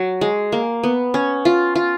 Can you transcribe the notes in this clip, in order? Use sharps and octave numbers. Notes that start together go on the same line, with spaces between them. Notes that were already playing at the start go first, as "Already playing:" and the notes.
Already playing: F#3
G#3
A#3
B3
C#4
F4
F4